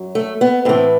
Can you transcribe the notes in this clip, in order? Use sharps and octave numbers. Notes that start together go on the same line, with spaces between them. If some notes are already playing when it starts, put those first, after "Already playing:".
Already playing: F#2 F#3
A3
B3
A2 E3 C4